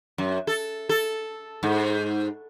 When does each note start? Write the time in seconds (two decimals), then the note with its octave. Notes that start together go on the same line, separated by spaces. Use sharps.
0.18 F#2
0.47 A4
0.89 A4
1.63 G#2